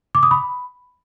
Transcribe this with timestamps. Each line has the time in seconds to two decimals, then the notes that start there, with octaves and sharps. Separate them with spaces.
0.15 D6
0.23 D#6
0.31 B5